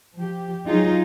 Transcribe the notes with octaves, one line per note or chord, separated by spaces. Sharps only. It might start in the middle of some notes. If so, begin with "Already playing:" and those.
F3 G4
F#3 D#4 F4 G#4